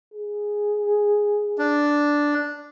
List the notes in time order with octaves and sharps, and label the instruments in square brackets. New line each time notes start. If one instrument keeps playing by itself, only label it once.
[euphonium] G#4
[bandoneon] D4